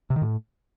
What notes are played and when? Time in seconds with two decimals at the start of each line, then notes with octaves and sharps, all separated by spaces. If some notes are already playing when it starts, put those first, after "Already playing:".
0.10 C3
0.16 D#3
0.22 A2